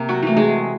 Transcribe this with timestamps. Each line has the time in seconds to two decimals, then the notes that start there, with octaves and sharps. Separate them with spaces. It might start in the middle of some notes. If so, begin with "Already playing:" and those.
Already playing: C3 A#3 A#4
0.09 F#3 F#4
0.23 E3 A3
0.37 G#3 G#4